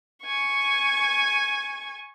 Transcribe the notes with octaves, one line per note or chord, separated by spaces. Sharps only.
G#5 C#6